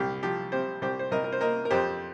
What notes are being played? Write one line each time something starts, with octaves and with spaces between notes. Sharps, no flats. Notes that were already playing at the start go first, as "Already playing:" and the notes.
Already playing: C2 G4
F3 G4
C3 G4 C5
C2 G4 C5
C5
C2 A#4 D#5
A#4
C5
A#3 A#4 D#5
A#4
F2 G4 C5